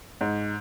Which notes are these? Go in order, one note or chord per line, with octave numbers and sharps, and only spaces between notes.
G#2